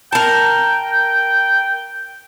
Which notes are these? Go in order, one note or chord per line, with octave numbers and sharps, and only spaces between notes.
A#4 G5 A5